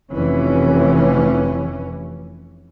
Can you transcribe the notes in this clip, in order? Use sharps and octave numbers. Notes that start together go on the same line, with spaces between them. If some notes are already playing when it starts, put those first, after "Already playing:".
F1 E3 C#4